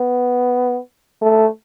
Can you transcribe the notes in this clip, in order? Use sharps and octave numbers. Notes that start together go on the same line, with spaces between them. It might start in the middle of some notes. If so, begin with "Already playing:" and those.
Already playing: B3
A3